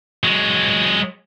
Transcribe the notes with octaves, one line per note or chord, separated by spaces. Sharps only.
F#3 G#3